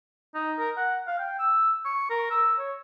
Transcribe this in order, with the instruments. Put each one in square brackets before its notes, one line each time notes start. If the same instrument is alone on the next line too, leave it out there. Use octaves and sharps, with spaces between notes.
[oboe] D#4
A#4
F#5
F5
G5
E6
C#6
A#4
E6
C#5